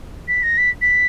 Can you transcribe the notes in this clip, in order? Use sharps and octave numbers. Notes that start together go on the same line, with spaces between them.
B6
A#6
B6
B6